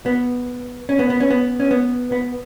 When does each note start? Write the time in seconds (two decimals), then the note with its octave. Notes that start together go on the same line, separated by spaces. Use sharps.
0.06 B3
0.89 C#4
0.99 B3
1.10 B3
1.20 C#4
1.30 B3
1.60 C#4
1.71 B3
2.12 B3